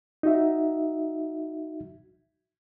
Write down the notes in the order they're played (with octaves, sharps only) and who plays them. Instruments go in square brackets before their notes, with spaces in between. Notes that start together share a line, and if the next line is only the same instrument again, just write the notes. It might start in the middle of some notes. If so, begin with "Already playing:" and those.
[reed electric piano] D#4 F#4 E5